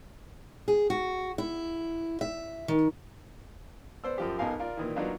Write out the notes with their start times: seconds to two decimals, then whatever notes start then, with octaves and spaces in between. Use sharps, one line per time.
0.68 G#4
0.90 F#4
1.38 E4
2.21 E5
2.68 D#3
4.04 B3 C5 D5 E6
4.18 F#2 F3 G4
4.39 B1 B2 D#4 A#4 F5 G#5
4.60 F4 A#4 D5
4.77 A#2 D#3 E3
4.96 F#3 A#3 B3 D4 D#4 F4